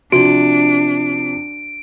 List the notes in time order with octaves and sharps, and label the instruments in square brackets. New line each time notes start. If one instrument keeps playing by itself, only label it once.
[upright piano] C3 F3 [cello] D4 [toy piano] F#4 [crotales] D7